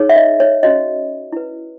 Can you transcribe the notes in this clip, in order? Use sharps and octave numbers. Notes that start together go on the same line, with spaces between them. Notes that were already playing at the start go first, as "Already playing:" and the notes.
Already playing: D#4 G#4 C#5
E5
D#5
C#5
C#4 F#4 C#5 D#5
E4 B4